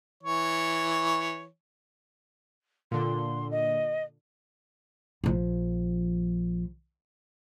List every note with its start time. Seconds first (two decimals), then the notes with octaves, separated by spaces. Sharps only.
0.23 E3 C#5
2.91 A#2 D3 C6
3.51 D#5
5.24 A#1 F3